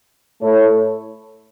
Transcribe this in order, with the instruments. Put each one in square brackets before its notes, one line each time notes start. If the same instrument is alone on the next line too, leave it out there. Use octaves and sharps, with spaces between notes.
[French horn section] A2 A3 E4 A4 C#5